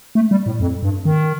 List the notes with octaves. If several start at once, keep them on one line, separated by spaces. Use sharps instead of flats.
A3
G3
A2
F2
G2
D#3